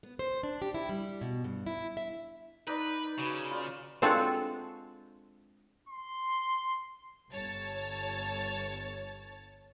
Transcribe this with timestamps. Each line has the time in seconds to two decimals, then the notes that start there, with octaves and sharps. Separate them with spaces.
0.03 B3
0.19 C5
0.43 D4
0.62 G4
0.74 E4
0.89 G3
1.21 B2
1.44 G2
1.66 E4
1.97 E5
2.67 D#4 B4 D5
3.18 C#3 F#4 B4
3.51 F4 D5
4.02 G#3 C4 D4 F4 F#4 A4
5.89 C6
7.31 G1 C#5 A5 A6